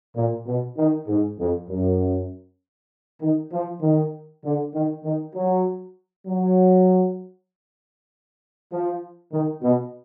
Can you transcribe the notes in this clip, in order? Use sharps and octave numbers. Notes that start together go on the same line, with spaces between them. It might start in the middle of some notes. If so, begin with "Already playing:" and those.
A#2
B2
D#3
G#2
F2
F#2
D#3
F3
D#3
D3
D#3
D#3
F#3
F#3
F3
D#3
B2